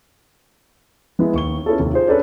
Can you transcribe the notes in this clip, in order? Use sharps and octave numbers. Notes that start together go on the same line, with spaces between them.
G#3 B3 E4
D#2 C#6 G7
B3 C#4 E4 F4 G#4 A4
D#2 C3
F4 G#4 C5
C#4 D4 G#4 A4 B4 C#5